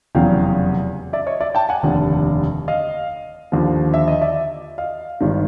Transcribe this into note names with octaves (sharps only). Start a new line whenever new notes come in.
F1 E2 C#3 F#3 F5 G5
D5 E5
C#5 D#5
D5 E5
G5 A5
F#5 G#5
F1 D#2 D3
D#5 F5
D#2 D3 F3
E5
D#5
D5 E5
D#5 F5
G#1 G2 D#3